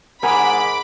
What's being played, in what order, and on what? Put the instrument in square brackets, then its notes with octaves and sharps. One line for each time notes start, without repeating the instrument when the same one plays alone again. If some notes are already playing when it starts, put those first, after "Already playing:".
[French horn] G#2 [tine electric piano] G#4 F#5 G#5 [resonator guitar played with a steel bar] A#4 [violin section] B5 D6